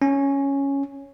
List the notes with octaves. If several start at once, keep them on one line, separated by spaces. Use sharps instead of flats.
C#4